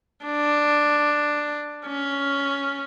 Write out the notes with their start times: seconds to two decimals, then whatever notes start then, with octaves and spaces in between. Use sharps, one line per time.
0.24 D4
1.87 C#4